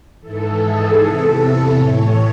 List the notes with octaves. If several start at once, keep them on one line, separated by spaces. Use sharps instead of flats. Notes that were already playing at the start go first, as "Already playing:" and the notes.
G#2 E3 A4
G#4
E2 C3 E3 A4
A2 E3 C#5